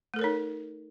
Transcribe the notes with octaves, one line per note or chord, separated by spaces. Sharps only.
A3 D#4 A4 A#4 C#5